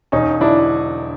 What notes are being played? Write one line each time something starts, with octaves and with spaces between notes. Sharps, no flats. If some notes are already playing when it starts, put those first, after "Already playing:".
E1 C#4 D#4
D3 D4 E4